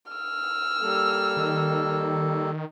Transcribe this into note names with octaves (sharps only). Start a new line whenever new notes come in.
E6 F6
G3 A#3 A4
D#3